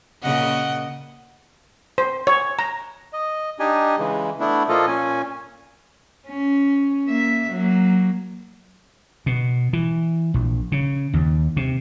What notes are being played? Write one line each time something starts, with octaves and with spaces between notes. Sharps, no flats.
A#2 C#3 D#5 F#5
C5
C#5
A#5
D#5
D4 D#4 G4 D#5 G#5
C#3 E3 G#3
A3 B3 D4 E4
A#2 F3 A#3 F4 A4 D#5
A#2 C#4 G#5
C#4
A#3 E5
F#3 A#3
B2
E3
A#1
C#3
D#2
C3